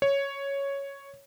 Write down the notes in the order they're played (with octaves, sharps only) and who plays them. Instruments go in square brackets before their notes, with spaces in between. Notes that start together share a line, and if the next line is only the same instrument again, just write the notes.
[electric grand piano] C#5